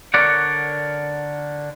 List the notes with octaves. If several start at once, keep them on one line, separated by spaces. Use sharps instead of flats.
D3 A#4 C#5 D5 F#5